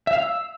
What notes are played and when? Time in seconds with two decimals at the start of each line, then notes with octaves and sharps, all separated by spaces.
0.07 E5
0.13 F5
0.19 E6